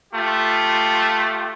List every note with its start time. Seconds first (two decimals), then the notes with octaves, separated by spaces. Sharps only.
0.13 A3 F4 G4